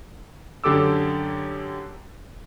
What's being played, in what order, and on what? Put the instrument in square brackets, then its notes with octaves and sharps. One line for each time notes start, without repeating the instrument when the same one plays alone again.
[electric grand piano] F#2 D3 G4 A4 D6 E6